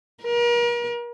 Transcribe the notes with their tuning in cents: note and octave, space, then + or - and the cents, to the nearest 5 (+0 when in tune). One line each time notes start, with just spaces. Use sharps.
A#4 +40